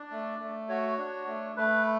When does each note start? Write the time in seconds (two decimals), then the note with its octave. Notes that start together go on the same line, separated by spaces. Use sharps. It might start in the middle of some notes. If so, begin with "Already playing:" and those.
Already playing: D4 D5
0.11 A3
0.39 A3
0.69 F#4 C#5
0.98 D4
1.27 A3
1.56 A3 B4